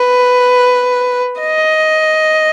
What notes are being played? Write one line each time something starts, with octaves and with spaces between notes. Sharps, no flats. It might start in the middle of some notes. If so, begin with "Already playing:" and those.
Already playing: B4
D#5